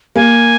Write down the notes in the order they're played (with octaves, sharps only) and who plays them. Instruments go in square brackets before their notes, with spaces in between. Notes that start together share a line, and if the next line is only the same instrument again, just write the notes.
[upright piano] A#3 [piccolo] G#5